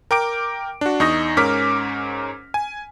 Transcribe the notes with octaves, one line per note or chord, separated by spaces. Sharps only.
A#4 G5 D6 D7
D4 F#4
E2 D#4 C#6 D#6 A#6
G#2 C#4 A#4 D6 F6 B6
G#5